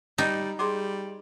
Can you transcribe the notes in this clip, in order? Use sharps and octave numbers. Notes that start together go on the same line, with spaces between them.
G3 D#4
G3 G#4 C6 D6